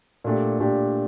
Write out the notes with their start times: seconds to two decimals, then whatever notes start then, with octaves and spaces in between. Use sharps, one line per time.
0.24 A#2 A3 D4 G4
0.59 A#2 A3 D4 G4